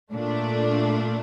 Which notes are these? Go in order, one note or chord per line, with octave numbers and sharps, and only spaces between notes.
A#2 A3 D4